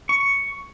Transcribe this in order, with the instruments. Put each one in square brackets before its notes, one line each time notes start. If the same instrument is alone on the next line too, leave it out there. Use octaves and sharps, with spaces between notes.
[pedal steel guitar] C#6